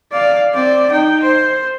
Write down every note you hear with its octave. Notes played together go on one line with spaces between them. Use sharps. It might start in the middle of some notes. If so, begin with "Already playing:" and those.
D5 F5
C4 D5
D#4 G5
C5